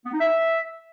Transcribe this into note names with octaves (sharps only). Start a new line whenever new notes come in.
B3
D#4
E5